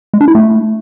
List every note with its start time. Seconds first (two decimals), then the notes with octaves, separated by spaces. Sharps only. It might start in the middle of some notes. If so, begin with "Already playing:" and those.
0.14 G#3
0.21 D4
0.28 E4
0.35 A3